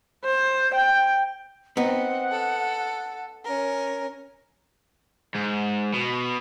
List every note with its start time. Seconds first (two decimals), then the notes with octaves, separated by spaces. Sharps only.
0.24 C5
0.74 G5
1.77 B3 C4 D#4 F#5
2.31 A4
3.45 C#4 A#4
5.35 G#2
5.94 B2